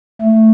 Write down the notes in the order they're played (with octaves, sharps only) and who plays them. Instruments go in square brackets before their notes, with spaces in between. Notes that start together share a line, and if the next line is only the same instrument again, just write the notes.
[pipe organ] A3